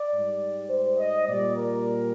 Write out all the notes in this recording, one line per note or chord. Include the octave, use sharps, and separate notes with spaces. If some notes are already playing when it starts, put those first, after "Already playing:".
Already playing: D5
G#2 G3
C5
D#5
A#2 G3 D5
A#4